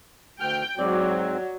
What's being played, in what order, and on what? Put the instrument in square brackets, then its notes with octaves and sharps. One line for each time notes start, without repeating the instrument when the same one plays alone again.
[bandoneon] D2 F6 [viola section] G5
[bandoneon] G#2 C4 [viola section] F#3 [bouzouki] D5